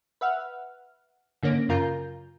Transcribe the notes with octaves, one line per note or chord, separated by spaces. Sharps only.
B4 E5 F#5 F6
G#2 D3 A#3 C#4 A#6 D7
F#2 C#3 F4 A#4 A#5 G6